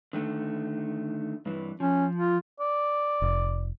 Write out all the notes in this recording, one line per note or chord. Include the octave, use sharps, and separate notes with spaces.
D3 D#3 A3
G2 E3
F3 C#4
F4
D5
F1